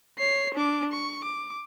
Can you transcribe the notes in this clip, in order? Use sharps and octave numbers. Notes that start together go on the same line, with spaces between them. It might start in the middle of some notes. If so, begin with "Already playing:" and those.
C#5 C7
D4 D6
C#6
D6